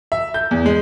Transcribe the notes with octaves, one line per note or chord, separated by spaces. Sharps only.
E5
G6
E2
G#3